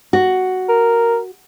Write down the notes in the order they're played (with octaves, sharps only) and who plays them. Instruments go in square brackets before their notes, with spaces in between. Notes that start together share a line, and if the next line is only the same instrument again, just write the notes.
[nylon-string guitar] F#4
[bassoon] A#4